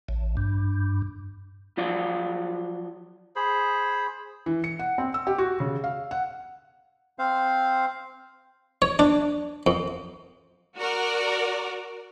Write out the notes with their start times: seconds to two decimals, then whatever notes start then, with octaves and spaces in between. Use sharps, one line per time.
0.09 A1
0.37 G2
1.77 F3 F#3 F4 D5
3.36 G#4 C5 B5
4.46 E3
4.64 C#7
4.79 F#5
4.98 C4
5.14 E6
5.27 G4
5.38 F#4
5.60 C#3
5.84 F5
6.11 F#5
7.19 C4 C5 F5
8.82 C#5
8.99 D4
9.67 F2
10.77 F#4 A#4 D5